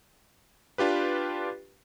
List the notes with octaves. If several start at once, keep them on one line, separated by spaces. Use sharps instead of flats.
D4 F4 G4 B4